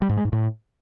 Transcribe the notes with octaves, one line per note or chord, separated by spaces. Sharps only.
G3
G#2
G#3
G#2
A2